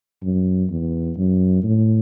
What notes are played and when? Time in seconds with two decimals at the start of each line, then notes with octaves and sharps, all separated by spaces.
0.23 F#2
0.70 E2
1.17 F#2
1.63 A2